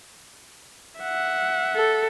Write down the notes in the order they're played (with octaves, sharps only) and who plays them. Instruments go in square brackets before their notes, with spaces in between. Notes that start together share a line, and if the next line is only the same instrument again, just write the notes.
[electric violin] E5 F#5
[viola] A4